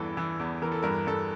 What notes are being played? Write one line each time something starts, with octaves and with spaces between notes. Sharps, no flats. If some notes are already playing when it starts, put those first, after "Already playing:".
Already playing: E2 G2 E3 A4
E3
E2
E3 A#4
A4
G2 A#4
G2 A4